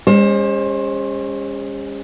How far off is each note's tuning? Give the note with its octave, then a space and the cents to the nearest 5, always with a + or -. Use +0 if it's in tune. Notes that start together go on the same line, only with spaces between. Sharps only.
G#3 -45 C#4 +0 C5 +25